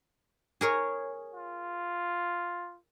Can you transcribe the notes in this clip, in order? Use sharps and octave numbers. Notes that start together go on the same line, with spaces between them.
G#4 A#4 C#5
F4